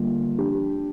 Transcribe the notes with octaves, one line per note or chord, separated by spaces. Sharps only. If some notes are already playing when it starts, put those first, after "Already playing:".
Already playing: D3 G3 A#3 F4
F3 D4 G4